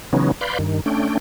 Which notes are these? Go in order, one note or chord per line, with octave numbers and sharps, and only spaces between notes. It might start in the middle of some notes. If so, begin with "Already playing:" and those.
C#3 E3 F#3 B3 C#4 D#4
B4 D5 F5 B5 C6 G6
G2 D#3
A3 C#4 D4 G5